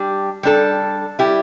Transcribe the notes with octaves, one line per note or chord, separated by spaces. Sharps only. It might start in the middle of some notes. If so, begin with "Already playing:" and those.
Already playing: G3 D4 G4
G3 D4 A4
G3 E4 G4